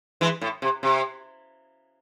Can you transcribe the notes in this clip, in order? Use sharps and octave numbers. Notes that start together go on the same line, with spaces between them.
E3 G#3
A2
C3
C3